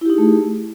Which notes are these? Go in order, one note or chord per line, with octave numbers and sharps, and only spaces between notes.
A3 D#4 E4 G4 G#4